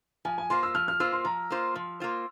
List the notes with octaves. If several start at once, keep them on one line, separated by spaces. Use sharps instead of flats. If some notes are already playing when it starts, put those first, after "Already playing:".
F3 G#5
G#5
A#3 F4 C5 C6
E6
F3 F6
F6
A#3 F4 C5 E6
C6
F3 A#5
A#3 F4 C5
F3 C6
A#3 F4 C5